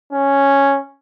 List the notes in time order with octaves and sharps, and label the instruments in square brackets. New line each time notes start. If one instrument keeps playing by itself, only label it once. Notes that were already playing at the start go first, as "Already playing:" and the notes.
[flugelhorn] C#4